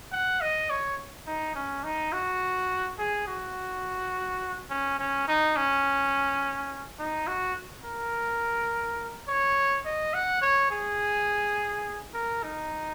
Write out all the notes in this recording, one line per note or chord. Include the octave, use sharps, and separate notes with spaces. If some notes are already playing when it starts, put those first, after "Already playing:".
F#5
D#5
C#5
D#4
C#4
D#4
F#4
G#4
F#4
C#4
C#4
D#4
C#4
D#4
F#4
A#4
C#5
D#5
F#5
C#5
G#4
A#4
D#4